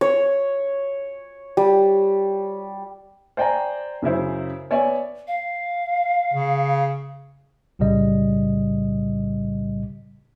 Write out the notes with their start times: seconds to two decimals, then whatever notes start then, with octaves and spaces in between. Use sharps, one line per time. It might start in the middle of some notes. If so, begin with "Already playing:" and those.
0.01 C#5
1.57 G3
3.37 C5 D5 G5 G#5 A#5
4.02 F#2 C#3 E4 C5
4.70 B3 C#5 D5 E5 G#5
5.27 F5
6.34 C#3
7.79 B1 A2 C#3 G3 D#5